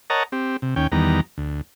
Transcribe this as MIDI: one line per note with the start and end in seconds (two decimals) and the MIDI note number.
0.10 0.23 70
0.10 0.23 73
0.10 0.23 75
0.10 0.23 78
0.10 0.23 81
0.10 0.23 82
0.32 0.57 60
0.32 0.57 67
0.62 0.75 48
0.76 0.87 39
0.76 0.87 61
0.76 0.87 79
0.92 1.21 40
0.92 1.21 51
0.92 1.21 55
0.92 1.21 59
0.92 1.21 82
1.38 1.61 38